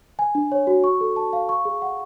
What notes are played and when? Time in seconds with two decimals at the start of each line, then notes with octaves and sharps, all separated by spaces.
0.19 G#5
0.35 D4
0.52 C#5
0.67 F#4
0.84 C#6
1.01 A4
1.16 A5
1.33 F5
1.49 C#6
1.65 G#4
1.82 F#5